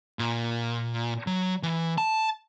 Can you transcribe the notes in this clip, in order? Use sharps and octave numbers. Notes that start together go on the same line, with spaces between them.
A#2
F#3
E3
A5